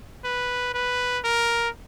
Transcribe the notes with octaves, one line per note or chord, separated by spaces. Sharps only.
B4
B4
A#4